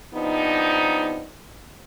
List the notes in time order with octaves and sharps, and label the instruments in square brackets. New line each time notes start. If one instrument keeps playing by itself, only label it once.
[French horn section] C3 F3 B3 D4 D#4